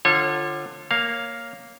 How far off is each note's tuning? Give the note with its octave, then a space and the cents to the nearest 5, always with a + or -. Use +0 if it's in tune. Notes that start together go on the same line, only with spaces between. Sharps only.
D3 +20 F4 +0 C#5 -30
A#3 +0 C#5 +0 F5 +0